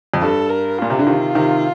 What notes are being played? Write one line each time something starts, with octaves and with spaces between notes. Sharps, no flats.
F2
G2 A4
A#4
A#2 F4
C3
D3
C3 D#3
C3 D#3